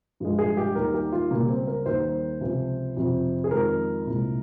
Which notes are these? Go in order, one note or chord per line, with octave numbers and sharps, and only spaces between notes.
G2 F3 G#3
G#4
G4
D#2 D#3 G3 A#4
G4
F4
C#2 C#3 G3 A#3
C4
A#4
D#2 D#3 G3 C5
C#2 C3 F3
F2 C3 F3
G#4
F2 D#3 G#3 A#4
C2 A#2 G#3